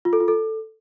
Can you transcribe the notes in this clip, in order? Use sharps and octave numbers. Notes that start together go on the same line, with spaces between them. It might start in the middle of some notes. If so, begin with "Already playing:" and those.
F4
A4
F4
A4